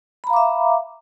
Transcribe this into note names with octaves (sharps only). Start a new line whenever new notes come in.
E5 F5 A#5 B5 D6